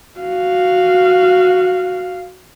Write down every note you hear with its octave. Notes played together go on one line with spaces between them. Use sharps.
F#4 F5